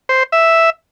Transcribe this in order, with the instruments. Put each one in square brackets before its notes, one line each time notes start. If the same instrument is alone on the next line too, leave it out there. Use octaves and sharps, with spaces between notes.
[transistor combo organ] C5
E5